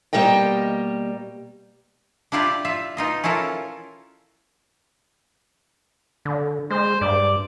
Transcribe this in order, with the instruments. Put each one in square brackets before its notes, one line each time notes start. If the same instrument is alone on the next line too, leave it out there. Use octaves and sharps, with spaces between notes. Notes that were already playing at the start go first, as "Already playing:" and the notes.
[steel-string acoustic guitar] B2 F#3 G3 A#3 D#5 G5
[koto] D4 E4 F4 G4 D5
F4 E5
B2 D#4 F4 D#5
C#4 E4 F4 A4 A#4
[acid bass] D3
[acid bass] G#3 [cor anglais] C5
[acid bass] G2 [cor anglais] D5